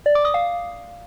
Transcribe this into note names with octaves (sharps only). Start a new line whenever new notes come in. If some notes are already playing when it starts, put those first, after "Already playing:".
D5
D6
D#6
F5